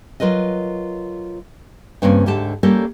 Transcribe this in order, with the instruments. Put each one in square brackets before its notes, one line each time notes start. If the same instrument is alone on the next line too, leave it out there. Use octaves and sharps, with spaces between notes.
[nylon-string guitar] F#3 F4 A#4 B4 D#5
G2 C#3 A#3 C4 C#4
D2 G#2 D3 G4 A5
G3 A#3 C#4 G4 A4 A#4